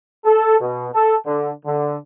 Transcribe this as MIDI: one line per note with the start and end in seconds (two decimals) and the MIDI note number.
0.24 0.56 69
0.60 0.88 47
0.94 1.15 69
1.26 1.50 50
1.65 1.97 50